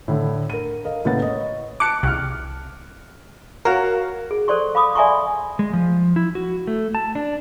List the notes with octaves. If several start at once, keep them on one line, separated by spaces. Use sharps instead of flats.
A2 D3 E4
A#4 D#7
A#4 D#5 F5
A2 C#3 A#3 B4 F#5 A6
C#5 D#5
A5 D6 F#6 C#7
C2 F6 F#6
F#4 A#4 C#5 F5
G#4
A4 C5 D5 C6 C#6
F5 B5 D6 D#6
D5 E5 G#5 A#5 C6 C#6
G#3
F3
E4
F#4
A3
A5
D4